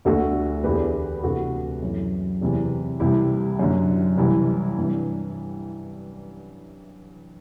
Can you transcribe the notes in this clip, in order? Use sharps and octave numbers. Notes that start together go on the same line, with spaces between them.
D2 D3 F#4 A4
E2 D3 G4 B4
D2 C3 E3 F#4 A4
F#2 E3
E2 C3 E3
C2 C3 E3 E4 G4
F#2 D3
C2 C3 E3 E4
G2 E3